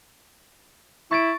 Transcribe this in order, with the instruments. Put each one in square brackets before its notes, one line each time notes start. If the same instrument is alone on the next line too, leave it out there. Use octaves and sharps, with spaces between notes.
[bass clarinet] E4 [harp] C#6 A6 D7